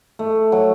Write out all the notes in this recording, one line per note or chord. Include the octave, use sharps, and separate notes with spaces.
A3
F#3